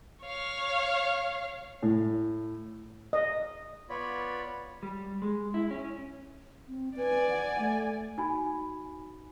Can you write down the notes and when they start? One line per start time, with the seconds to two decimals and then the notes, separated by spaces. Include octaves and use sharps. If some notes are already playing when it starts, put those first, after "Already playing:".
0.23 C#5 F5
1.82 A2
3.13 D#5
3.89 B3 F4 C#5 D5 B5
4.83 G3
5.22 G#3
5.54 E4
5.71 C#4
6.68 C4
6.97 B4 D5 G#5
7.29 F#5
7.59 A3
8.18 D#4 F#4 G#5 B5